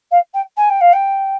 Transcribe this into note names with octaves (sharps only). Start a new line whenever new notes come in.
F5
G5
G#5
G5
F5
G5